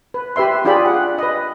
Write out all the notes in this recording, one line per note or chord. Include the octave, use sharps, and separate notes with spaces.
B4
G4 B4 E5 C6
D4 F4 G4 G#4 D5 B5
F#5
B4 D#5